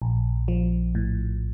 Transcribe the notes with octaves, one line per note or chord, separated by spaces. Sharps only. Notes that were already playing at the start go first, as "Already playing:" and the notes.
A#1
F3
A2